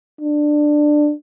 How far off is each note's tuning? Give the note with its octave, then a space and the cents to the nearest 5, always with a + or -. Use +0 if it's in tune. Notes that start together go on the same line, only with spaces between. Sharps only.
D4 +15